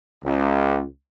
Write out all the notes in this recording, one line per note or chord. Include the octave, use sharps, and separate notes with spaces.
C#2